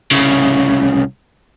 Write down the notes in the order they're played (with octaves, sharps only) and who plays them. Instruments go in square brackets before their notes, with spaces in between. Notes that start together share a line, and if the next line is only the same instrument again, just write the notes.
[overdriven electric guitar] C2 C#3